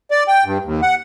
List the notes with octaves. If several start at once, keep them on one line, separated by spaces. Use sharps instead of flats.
D5
G5
G2
D#2
F#5